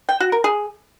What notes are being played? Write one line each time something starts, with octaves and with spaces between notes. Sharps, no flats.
G5
F#4
A#4
G#4